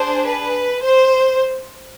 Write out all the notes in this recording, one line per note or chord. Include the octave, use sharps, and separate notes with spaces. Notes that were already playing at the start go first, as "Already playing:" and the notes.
Already playing: D4 G#4 C5
B4
C5